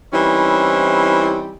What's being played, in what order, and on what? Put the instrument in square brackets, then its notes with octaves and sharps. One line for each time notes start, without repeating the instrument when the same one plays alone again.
[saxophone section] E3 G3 C4 C#4 D#4 E4